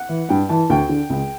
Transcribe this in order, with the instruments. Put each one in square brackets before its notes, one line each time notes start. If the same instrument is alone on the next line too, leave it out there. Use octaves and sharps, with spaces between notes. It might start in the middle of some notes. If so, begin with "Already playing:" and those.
Already playing: [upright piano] F#5
E3
G2 G5
E3 A5
D2 G5
D3
C#2